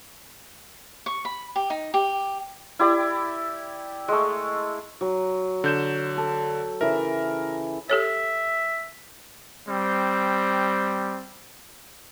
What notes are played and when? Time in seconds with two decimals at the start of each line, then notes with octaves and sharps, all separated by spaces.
1.06 C#6
1.25 B5
1.56 G4
1.70 D#4
1.94 G4
2.79 E4 G4 D5
4.08 G#3 A3
5.01 F#3
5.64 D3 G6 E7
6.17 A4
6.81 C#3 E3 A#4 E5
7.90 G4 A4 C#5 E5
9.67 G3 C4